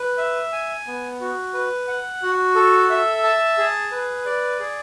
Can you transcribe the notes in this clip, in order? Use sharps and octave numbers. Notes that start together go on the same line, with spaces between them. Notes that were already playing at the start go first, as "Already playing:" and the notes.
Already playing: B4
E5
G#5
B3
F#4
B4
F#5
F#4
A4
E5
A5
G#4
B4
D5
G#4